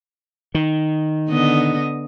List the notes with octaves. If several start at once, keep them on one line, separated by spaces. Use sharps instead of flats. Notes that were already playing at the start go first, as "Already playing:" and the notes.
D#3
D3 B3 D#5